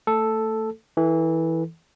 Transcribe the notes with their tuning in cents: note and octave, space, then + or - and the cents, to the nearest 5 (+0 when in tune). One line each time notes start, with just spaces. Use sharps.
A3 +25 A4 +0
E3 -15 A4 +10